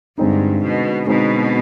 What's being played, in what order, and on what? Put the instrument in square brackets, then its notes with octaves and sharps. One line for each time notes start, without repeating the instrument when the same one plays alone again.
[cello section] G2 [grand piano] D3 G#3 C4 D#4
[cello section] B2
[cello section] B2 [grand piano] D3 G#3 C4 D#4